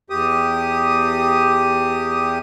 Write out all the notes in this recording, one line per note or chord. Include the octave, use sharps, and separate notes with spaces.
E2 G4 D#6